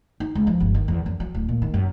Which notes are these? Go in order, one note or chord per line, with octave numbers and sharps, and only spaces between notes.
D#4
C#2
F3
G1
D#3
E2
F#2
F#3
D1
A#2
D#3
F#2